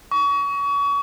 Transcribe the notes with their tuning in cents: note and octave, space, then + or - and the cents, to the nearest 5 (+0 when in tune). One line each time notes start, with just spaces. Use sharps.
C#6 +35